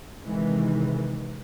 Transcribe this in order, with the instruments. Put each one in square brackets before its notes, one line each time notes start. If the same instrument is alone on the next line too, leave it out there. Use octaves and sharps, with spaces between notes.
[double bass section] C3 D#3 E3 G#3